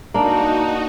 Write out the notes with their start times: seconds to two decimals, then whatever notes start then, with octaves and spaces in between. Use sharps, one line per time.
0.14 A#3 D4 D#4 F#4